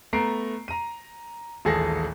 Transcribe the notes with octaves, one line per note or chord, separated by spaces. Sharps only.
A3 B3 A#5 C7 D7
A#5 D#7
D#1 A1 G#4 A4 A5 A#6